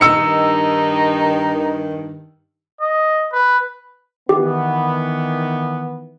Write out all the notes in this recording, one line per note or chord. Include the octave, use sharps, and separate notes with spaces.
G2 D#3 D#4 E6 C#7
D#5
B4
D#3 E3 B3 G4